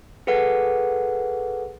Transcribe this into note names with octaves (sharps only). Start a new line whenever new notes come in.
G#4 A4 B4 F#5